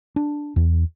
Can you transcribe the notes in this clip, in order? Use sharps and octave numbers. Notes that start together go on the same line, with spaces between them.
D4
E2